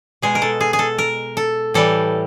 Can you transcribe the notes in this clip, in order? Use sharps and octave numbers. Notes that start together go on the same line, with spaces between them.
B2 G#3 G#4
A#4
A4
G#4
G#4
A4
A#4
A4
A2 E3 G3 A4